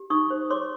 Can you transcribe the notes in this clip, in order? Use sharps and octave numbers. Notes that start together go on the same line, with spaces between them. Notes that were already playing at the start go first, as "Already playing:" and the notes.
Already playing: G4
D#4 C#6 D#6
C5
C#5 C6 D6